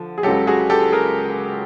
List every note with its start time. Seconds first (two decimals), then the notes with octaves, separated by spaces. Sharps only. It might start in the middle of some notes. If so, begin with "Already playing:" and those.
Already playing: D3 F3
0.18 G#4
0.23 C#2 C#3 F#3 G4 A4
0.47 F#4 G#4
0.70 G4 A4
0.92 G#4 A#4